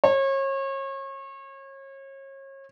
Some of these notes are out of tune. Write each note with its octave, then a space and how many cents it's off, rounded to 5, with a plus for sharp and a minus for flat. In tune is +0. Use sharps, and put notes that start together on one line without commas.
C#5 -35